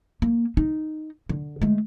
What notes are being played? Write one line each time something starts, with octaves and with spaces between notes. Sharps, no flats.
A#3
D#4
D3
G#3 A3